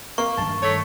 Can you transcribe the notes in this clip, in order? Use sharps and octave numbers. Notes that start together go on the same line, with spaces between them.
A#3 C#6
G2 D#3 A5
A3 C#5